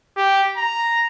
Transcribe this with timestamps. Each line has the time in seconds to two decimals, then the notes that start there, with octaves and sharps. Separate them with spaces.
0.17 G4
0.57 A#5